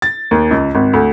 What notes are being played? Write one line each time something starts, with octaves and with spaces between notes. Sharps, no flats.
A6
D#2
C#2
G#1
D2